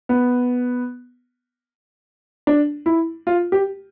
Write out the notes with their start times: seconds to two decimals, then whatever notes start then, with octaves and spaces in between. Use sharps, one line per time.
0.09 B3
2.47 D4
2.86 E4
3.27 F4
3.52 G4